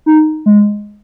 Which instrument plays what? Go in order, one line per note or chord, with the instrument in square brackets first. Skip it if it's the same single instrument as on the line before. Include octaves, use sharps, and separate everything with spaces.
[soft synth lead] D#4
G#3